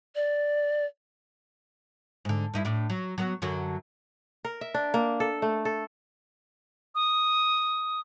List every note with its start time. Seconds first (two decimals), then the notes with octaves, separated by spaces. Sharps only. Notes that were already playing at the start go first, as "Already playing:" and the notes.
0.15 D5
2.25 G#2 D3
2.54 G2 D#4 E4
2.65 A2 D4
2.90 F#3
3.18 F#3 B3
3.42 F#2 D3 F#3
4.45 A#4
4.61 E5
4.74 D4
4.94 A#3
5.20 A4
5.42 A3
5.65 A4
6.95 D#6